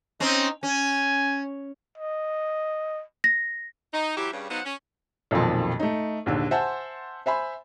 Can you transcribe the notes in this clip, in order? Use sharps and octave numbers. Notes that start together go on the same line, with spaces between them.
C4 C#4 D#4
C#4 G#5
D#5
A#6
D#4
E3 F#3 E4 G4
G2 C#3
F#3 B3 D#4 C5 F5 F#5
C#4
B1 F2 A#2 D#3 F3
A3 D#4
A#1 D#2 D3
C5 E5 F#5 G#5 A5 C6
C5 E5 G#5 B5